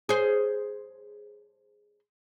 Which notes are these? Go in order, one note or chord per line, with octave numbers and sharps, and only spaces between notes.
G#4 C5